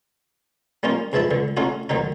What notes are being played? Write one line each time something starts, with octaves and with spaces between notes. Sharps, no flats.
G3 A#3 C#4 D#4 F4
E2 G#2 F3 E5 A5 B5
C#2 D3
A3 C#4 D#4 F4 F#4
D2 D#3 F#3 D#4